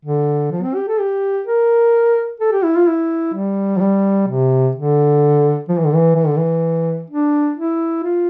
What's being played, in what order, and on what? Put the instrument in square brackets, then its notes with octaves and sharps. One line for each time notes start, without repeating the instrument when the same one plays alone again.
[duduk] D3
F3
C4
G4
A4
G4
A#4
A4
G4
E4
F4
E4
G3
F3
G3
C3
D3
F3
E3
D3
E3
E3
D3
E3
D4
E4
F4